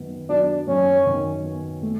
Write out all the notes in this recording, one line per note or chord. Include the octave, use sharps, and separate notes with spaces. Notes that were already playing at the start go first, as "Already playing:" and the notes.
Already playing: F#2 D#3 B3
F#3 D4
F#2 C#4
D#3
B3
A3